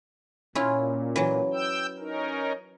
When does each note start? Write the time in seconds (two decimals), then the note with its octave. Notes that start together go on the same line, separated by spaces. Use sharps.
0.55 A#2 C#4 E4 F4
1.16 E3 F#3
1.54 G5 E6 G6
1.99 C#4 D#4 A#4